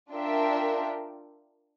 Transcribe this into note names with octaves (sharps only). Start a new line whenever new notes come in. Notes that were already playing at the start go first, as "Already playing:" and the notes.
D4 F4 A#4 E5 G5